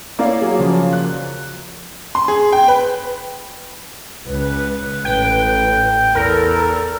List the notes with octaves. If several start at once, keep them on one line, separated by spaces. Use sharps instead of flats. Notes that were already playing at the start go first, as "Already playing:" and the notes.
A#3 E4 C#5 D5 F5
F#3 G#4
C#3 F3 C#5
F#6
C6
G#4
G5
B4
C#2 B4
A1 G5
E2 A4 A#4